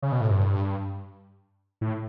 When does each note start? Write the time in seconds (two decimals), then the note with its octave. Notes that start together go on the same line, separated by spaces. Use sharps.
0.02 C#3
0.12 B2
0.21 A2
0.30 G2
1.81 A2